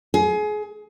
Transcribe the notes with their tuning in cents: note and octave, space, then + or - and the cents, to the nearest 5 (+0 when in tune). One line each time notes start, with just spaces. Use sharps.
G#4 +25